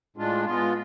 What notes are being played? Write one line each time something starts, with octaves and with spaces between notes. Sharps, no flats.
A2 G#3 D4 F4
G#3 B3 F4